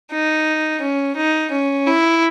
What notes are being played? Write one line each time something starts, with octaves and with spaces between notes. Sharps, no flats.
D#4
C#4
D#4
C#4
E4